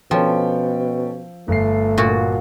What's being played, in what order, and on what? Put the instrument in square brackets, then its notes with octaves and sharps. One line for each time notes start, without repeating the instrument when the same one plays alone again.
[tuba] B2 [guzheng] F3 [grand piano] C#4 A4 G5
[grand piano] G1 C7 [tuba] A3
[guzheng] A#2 F#4